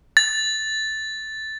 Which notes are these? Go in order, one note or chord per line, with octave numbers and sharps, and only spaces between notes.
A6